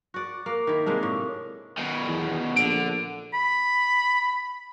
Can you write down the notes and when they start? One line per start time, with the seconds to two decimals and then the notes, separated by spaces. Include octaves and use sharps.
0.14 F#4 D5
0.46 A#3
0.67 D#3 E4
0.86 C3 G#3 A#3 D4
1.03 A2
1.78 B2 D#3
2.06 E2
2.56 A#1 D3 D7
3.34 B5